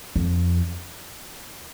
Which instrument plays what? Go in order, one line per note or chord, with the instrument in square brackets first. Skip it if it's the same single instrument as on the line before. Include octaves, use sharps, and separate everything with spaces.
[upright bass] F2